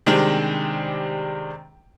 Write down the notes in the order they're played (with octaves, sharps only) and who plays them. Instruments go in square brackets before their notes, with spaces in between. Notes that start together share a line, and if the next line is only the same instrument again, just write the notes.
[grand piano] C3 D#3 G3 G#3 C4 D4